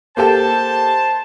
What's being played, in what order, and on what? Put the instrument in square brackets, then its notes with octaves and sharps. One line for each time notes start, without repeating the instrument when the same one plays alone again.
[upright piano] A#3 G4 A4 [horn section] C5 A5